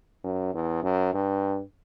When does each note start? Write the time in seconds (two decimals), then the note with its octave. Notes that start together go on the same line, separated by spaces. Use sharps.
0.24 F#2
0.54 E2
0.83 F#2
1.14 G2